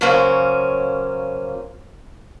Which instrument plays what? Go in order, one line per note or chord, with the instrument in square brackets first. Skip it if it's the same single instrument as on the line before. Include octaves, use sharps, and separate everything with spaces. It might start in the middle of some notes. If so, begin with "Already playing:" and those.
[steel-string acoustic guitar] C#3 F#3 A#3 C#4 C5